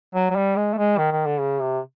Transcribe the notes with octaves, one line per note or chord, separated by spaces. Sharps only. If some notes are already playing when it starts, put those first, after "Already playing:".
F#3
F#3
G3
G#3
A3
G#3
D#3
D#3
D3
C#3
C3